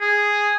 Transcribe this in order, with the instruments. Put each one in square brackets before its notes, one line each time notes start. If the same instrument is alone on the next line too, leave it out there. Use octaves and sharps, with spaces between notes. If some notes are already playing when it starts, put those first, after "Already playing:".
[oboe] G#4